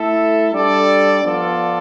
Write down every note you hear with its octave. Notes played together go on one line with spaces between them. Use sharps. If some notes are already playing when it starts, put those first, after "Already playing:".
Already playing: A3 E4 A4 E5
G3 D4 A4 D5
F3 B3 F4 A4 D5